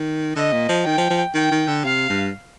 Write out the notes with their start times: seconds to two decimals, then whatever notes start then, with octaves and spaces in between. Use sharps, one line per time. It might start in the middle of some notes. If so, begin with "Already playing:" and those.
Already playing: D#3
0.36 D3 D#5
0.52 A#2
0.69 F3
0.85 D#3 G5
0.97 F3
1.10 F3
1.34 D#3 G5
1.51 D#3
1.67 D3
1.84 C3 F5
2.09 G2